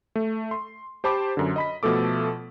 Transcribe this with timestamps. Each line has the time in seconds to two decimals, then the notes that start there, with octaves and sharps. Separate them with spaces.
0.16 A3
0.51 C6
1.04 G4 C5 A5 B5 D6
1.37 F#2 D3
1.56 D#5 B5 B6
1.83 B2 F3 A3 A4 D6